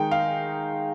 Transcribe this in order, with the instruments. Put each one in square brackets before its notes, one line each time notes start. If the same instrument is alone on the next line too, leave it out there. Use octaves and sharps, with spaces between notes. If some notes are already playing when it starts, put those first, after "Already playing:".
Already playing: [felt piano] D#3 G#3 D#4 G5
F5